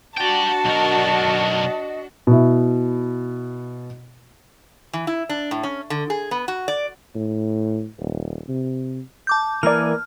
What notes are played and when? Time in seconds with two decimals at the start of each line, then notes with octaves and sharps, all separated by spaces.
0.18 D4 F#4 D5 G5 A5
0.65 B1 A#4 D#5
2.27 B2 E4
4.93 E3
5.07 E4
5.29 D4
5.51 A2
5.63 C#4
5.90 D3
6.10 G#4
6.31 B3
6.48 F#4
6.68 D5
7.15 A2
7.99 D#1
8.48 C3
9.27 A5 D6 G6
9.63 E3 A#3 A#4 D5 G#5 F6